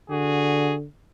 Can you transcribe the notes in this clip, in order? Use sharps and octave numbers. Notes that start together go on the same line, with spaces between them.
D3 F#4 G#4